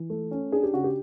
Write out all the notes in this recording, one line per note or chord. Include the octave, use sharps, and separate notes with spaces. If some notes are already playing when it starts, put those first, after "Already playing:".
Already playing: E3
A3
C#4
D4 G#4
G4
C#3 F#4
G4